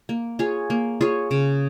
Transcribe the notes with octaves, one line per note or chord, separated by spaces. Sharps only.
A#3
F4 G#4 C#5
A#3
F4 G#4 C#5
C#3